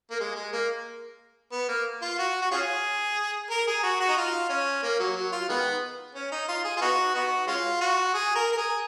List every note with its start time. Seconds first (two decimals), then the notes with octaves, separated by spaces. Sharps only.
0.10 A#3
0.20 G#3
0.36 G#3
0.53 A#3
1.52 B3
1.69 A#3
2.02 F4
2.18 F#4
2.41 F#4
2.51 C#4 F4 G#4
3.50 A#4
3.67 G#4
3.83 F#4
4.00 F#4
4.09 D#4
4.17 F4
4.49 C#4
4.83 A#3
5.00 F#3
5.16 F#3
5.32 F4
5.49 D#3 G#3 B3
6.15 C#4
6.32 D#4
6.48 F4
6.64 G#4
6.77 F4
6.81 B3 D#4 F#4
7.15 B3 D#4 F#4
7.47 G#3 C#4 F4
7.81 F#4
8.14 G#4
8.35 A#4
8.52 A#4
8.57 G#4